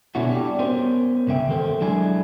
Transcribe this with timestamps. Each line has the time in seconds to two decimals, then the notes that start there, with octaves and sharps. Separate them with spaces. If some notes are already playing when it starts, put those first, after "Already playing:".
0.15 B2 D3 C#4 D4 E4 F#4
0.30 G3 D4 G4
0.59 B3 C#4 A#4 C5
1.27 C2 G2 C#3 E5 G5
1.49 D#2 D#3 A4 A#4 C5
1.81 F#3 G#3 D4 E4 G#4